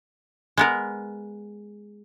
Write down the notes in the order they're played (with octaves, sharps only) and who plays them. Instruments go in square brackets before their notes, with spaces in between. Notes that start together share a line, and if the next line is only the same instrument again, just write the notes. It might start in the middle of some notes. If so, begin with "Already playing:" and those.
[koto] G#3 B3 A#4